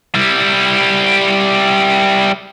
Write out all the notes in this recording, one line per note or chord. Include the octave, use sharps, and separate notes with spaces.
G3 E4